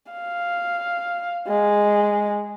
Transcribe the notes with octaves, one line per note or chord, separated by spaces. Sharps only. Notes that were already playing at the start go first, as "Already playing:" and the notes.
F5
G#3